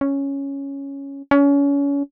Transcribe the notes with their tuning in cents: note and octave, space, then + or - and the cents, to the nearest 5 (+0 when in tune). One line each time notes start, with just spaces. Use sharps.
C#4 +0
C#4 +30